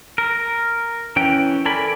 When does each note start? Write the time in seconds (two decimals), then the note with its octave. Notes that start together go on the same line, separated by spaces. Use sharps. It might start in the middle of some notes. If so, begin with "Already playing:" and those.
0.18 A#4
1.16 E3 C#4 G5
1.66 A4 A#4 D5 G#5 B5